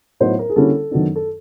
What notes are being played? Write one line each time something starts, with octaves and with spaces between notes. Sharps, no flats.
A2 F#3 B3 D#4 C5
A#4
G#4
D3 G3 A#3 C#4 E4 A4
F#2 D#3 F#3 B3 D4
A4